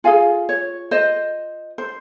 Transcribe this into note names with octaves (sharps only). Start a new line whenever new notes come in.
F4 G#4 F5 G#5
C#5
C5 D#5
C5